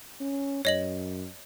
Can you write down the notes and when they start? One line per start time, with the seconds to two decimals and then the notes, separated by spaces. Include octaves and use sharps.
0.21 C#4
0.65 F#2 C#5 D#5 F#7